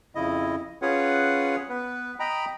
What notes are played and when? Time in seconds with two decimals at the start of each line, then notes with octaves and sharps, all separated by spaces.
0.15 F2 C#3 E4 D#5
0.82 C#4 F4 G#4 B4 C#5 F#5
1.69 B3 B4
2.20 D#5 G5 A#5 B5